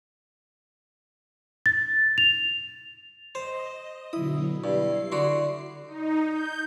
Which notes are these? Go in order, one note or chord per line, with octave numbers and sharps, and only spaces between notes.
A6
F7
C5 D#5
B2 D3 F#3 E4 D#6
G2 C7
D3 F#4 C6
D#4
G6